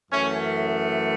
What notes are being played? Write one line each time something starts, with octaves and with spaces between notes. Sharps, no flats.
F#2 E3 A3 C#4